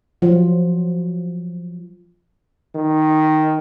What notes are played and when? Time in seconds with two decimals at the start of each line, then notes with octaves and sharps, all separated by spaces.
0.22 F3 F#3 F4
2.75 D#3